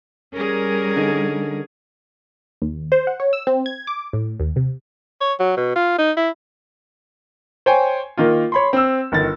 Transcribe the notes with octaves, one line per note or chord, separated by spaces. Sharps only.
G3 C#4 G#4 A#4
D3 D#4
D#2
C5
F#5
C#5
E6
C4
G#6
D6
A2
D#2
C3
C#5
F#3
B2
F4
D#4
E4
C5 C#5 G5 G#5
D#3 A#3 F4
C#5 B5 C6
C4 E6
G1 D#3 A6